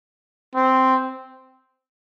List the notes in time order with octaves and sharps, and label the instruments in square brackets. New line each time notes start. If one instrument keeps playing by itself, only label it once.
[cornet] C4